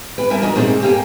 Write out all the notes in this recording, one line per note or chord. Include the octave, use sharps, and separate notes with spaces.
B4 G5
G3 A#4 E5 G#5
D4 F#4 A#4 D#5
A#2 A3 A#3 C4 D#4 G#4
A#3 G4 A#4 F5 G5 G#5